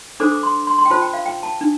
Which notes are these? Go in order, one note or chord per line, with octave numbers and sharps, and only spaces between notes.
D4 A4 C5 D6
D6
C6
C6
C6
G5
F4 C5 A5
G5
F5
G5
A5
D4